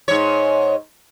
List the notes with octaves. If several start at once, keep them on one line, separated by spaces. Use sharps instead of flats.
G#2 C#5